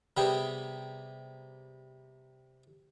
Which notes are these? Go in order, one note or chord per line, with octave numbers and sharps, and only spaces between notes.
C3 G3 B3 G#4 G5